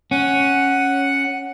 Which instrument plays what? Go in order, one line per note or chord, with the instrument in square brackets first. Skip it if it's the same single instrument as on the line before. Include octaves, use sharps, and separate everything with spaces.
[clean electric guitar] C#4 [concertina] F#5